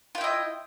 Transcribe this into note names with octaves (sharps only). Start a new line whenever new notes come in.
E4 F4 D#5 G5